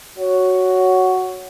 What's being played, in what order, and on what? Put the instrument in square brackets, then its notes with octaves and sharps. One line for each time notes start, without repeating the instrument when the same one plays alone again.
[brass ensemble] F#4 C#5